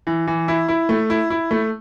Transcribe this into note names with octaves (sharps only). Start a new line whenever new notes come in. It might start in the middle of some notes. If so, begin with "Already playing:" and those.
E3
E3
E4
E4
A3
E4
E4
A3